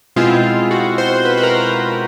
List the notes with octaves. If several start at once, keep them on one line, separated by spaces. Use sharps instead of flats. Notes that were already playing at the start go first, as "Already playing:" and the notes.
B2 G#3 C4 E4 F4
F#4
C5
B4
B4
A#4